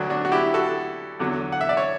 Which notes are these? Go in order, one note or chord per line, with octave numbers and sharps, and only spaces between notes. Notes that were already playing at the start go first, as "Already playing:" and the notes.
Already playing: D2 D3 F#3 D4 F#4
D4 F#4
F#4
E4 G4
F#4 A4
E2 D3 F#3
F#5
E5
D5
C#5